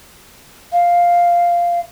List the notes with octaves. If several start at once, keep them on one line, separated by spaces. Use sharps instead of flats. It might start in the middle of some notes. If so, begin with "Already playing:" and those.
F5